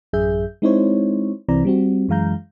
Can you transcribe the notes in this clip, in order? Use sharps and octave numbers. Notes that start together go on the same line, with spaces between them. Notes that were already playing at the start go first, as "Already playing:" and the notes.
A1 F#2 G#4 E5 G6
G#3 C4 D#4 E4 C5 C#5
C2 C3 E3 C4 D5 A#5
G3 C4 F#4
F#2 E3 G#3 F5 A#5 G6